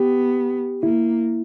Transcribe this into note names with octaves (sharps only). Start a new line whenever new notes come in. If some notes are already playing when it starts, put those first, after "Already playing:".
Already playing: B3 G4
A#3 E4